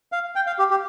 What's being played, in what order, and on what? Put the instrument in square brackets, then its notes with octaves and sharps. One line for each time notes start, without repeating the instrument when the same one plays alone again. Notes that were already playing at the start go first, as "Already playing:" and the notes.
[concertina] F5
G5
F5
G4
G4